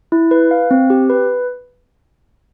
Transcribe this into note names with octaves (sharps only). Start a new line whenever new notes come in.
E4
B4
F5
C4
G4
B4